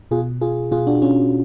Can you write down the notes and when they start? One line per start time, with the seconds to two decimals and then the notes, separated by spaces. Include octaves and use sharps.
0.11 B2 F4 G#4
0.41 F4 G#4
0.71 B2 F4 G#4
0.87 D4 F#4
1.02 C#4 F4